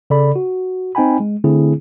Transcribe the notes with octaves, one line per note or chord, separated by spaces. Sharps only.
C#3 A4 D5 B5
F#4
C4 D#4 G5 G#5 B5
G#3
D3 A3 C4 E4 G#4